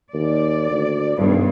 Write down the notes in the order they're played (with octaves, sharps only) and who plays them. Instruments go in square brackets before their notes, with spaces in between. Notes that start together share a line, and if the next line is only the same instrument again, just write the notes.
[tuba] D#2 [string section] D5
[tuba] D2
[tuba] D#1 [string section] G2 B2